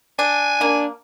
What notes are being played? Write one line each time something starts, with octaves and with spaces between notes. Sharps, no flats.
D4 G#5
A#3 D4